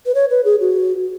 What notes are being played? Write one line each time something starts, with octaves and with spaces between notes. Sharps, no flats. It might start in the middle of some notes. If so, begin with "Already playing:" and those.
B4
C#5
B4
G#4
F#4